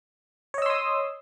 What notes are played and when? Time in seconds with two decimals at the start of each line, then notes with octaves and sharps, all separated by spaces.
0.54 C#5
0.58 D#5
0.62 E6
0.66 C6
0.70 D#6